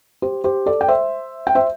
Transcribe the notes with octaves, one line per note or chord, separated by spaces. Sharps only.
G4 C5
G4 C5
A4 D5
G5
C5 E5
G5
C5 E5